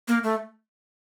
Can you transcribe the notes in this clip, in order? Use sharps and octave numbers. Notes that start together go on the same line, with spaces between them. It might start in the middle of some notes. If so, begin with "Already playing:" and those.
A#3
A3